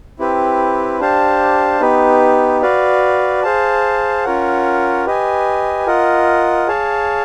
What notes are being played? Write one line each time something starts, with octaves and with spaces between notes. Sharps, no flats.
C4 E4 G4 B4
D4 G4 C5 F5 A5
B3 D#4 G4 B4
F#4 B4 D5 F5
G#4 C5 F5 A5
C#4 F4 A#4 C#5 F#5
G4 B4 D#5 G#5
F4 A#4 D#5 F#5
G#4 C#5 F5 A5